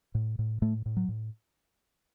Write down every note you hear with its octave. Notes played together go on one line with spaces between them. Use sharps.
A2
A2
A2 A3
A2
F#3
A2